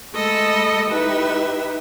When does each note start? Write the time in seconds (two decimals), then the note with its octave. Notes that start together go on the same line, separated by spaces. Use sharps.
0.12 G#3 A3 A4 D#5 B5 E6
0.89 D#4 E4 G4 B4 E5